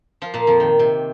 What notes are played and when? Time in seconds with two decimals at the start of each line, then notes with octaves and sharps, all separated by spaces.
0.22 F3 F4
0.34 A#2 A#3
0.47 F2 F3
0.60 D#3
0.79 C3